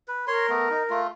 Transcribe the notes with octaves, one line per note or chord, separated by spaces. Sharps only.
B4
A#4 C#5 C6
A3 B3
D#4
A3 F4